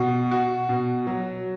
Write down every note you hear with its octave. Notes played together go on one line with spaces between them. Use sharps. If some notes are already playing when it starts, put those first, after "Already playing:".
Already playing: B2
F#4
B2
F#3